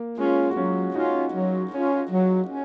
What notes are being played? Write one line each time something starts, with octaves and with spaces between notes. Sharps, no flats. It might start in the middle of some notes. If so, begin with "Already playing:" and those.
Already playing: A#3
G#3 C#4 F4
F#4
F#3 C#4 F4
C#4 D#4 F4 F#4
F#3
C#4 F4
F#3
C#4